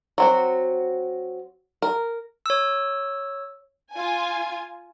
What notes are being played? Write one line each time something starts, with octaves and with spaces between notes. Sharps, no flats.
F#3 C4 F#4
A#4
C#5 E6
F4 G#5